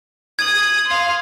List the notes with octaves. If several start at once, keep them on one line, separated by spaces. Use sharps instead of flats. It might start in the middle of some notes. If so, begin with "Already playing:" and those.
D#6 G#6 F#7
F5 C6